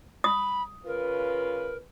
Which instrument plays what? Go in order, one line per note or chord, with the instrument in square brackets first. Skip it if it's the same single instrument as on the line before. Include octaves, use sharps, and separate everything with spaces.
[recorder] B5 [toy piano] D#6
[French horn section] C#3 F4 B4 [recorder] A#4